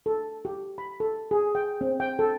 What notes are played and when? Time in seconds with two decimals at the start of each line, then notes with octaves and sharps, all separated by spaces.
0.06 A4
0.45 G4
0.78 B5
1.00 A4
1.31 G#4
1.55 G5
1.81 C4
2.00 G5
2.19 A4